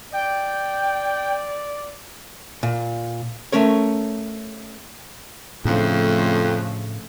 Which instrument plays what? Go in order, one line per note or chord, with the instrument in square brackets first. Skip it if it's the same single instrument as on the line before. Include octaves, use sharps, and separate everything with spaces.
[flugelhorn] D5 [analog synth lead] G5
[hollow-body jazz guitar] A#2
A3 C#4 A#4 C#5
[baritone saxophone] F2 [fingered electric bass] A2 D4 [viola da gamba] C#3 F3 A3